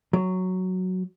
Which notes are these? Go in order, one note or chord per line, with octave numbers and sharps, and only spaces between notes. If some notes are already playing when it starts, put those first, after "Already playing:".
F#3